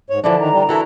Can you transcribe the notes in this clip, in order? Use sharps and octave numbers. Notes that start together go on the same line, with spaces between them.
G#2 C#5
D3 E3 F3 D4 A5
D#3 A#5
G3
E3 E4 F#4 A4 A#4